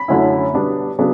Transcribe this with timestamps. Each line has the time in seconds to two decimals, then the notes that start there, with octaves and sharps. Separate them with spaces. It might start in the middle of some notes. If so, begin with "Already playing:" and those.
Already playing: B5
0.08 F#2 D3 A3 C#4 E4
0.53 B2 G3 B3 D4
0.99 C#3 F#3 B3 D4